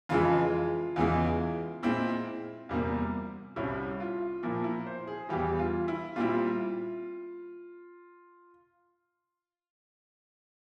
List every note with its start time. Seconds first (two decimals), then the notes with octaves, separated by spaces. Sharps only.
0.09 F2 C#3 E3 G#3 E4 F4
0.96 E2 C#3 E3 G#3 E4
1.83 A#2 G#3 C4 E4
2.69 E2 C3 G3 A#3
3.56 C2 C3 G3 C#4 E4
4.00 F4
4.43 A#2 F3 A#3 E4
4.64 E4
4.86 C5
5.07 G#4
5.29 E2 E3 G3 G4
5.59 F4
5.88 E4
6.16 A#2 G3 C4 E4 F4